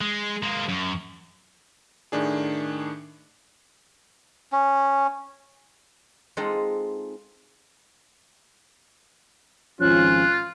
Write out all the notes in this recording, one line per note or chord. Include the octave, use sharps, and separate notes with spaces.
G#3
G#3 A#3
F#2
A2 D#3 D4 G#4
C#4
G#3 C4 D#4 F4 A4
G#1 F3 C#4 F4 F#6